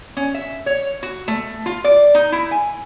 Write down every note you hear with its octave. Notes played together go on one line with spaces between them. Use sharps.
C#4
E5
C#5
F#4
A3
F4
D5
D#4
E4
G#5